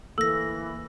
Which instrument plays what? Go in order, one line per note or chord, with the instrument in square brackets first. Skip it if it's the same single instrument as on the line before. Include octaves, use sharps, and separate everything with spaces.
[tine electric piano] D2 A#3 [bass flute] E3 [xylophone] A4 A#6 [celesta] E6